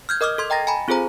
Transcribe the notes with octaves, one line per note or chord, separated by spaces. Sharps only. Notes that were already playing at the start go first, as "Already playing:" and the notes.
F6 G6 G#6
A#4 D#5 D6 D#6 F6
A4 C6 G#6
D#5 G5 A#5 A6 A#6
G#5 A#5 B5
C4 F4 G#4 A4 C5 A#5